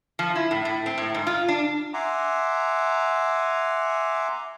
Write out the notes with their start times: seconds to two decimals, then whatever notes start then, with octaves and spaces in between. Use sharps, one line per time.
0.19 F3
0.35 E4
0.51 A2
0.65 A2
0.86 C4
0.98 A2
1.14 G#2
1.27 F4
1.48 D4
1.94 E5 F#5 G#5 A#5 C6 D6